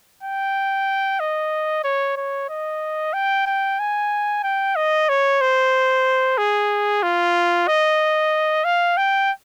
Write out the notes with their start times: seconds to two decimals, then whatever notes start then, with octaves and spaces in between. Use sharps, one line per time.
0.23 G5
1.20 D#5
1.84 C#5
2.17 C#5
2.49 D#5
3.13 G5
3.47 G5
3.79 G#5
4.43 G5
4.76 D#5
5.09 C#5
5.41 C5
6.38 G#4
7.03 F4
7.68 D#5
8.64 F5
8.97 G5